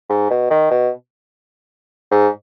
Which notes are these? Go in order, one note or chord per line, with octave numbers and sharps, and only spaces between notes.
G#2
B2
D#3
B2
G#2